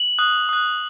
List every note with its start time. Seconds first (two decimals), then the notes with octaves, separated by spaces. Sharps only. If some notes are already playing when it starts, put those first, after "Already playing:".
Already playing: F#7
0.18 D#6 F#6
0.49 D#6 F#6